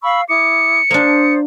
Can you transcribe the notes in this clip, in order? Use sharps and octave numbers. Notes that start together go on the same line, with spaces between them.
F5 B5 C#6 E6
E4 D6 D#6 C#7
A#3 D4 C5 D5 D#6